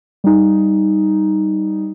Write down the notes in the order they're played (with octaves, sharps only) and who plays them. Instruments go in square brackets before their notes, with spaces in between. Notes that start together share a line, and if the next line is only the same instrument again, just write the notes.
[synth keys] G3 D#4